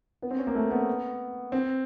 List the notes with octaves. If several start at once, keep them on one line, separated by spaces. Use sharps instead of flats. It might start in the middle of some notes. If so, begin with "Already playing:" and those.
B3
C4
C#4
A#3
A3
B3
C4